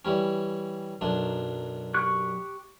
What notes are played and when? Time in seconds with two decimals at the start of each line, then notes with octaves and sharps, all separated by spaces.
0.05 E3 G3 C#4
1.01 B1 F#2 D4
1.94 G4 C#6 F#6